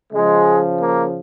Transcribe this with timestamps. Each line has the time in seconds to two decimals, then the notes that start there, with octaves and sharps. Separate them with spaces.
0.13 C#3 F3 G#3
0.81 A#3